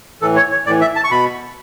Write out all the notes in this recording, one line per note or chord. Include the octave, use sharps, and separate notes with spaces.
A2 E3 A4
C#5
C#5
A2 E3 D5
E5
A5
C#6
B2 B5